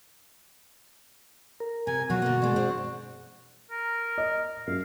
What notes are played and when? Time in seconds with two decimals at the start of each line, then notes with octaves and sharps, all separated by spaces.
1.60 A#4
1.87 C3 G#5
2.10 B2 F#3 F4 F#4
2.22 D3 A#3
2.42 G#3 D4
2.56 C4 D4
3.71 A#4
4.18 D#5
4.67 F#2 F5